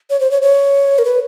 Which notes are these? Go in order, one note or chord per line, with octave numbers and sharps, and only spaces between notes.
C#5
C5
C#5
C#5
A#4
B4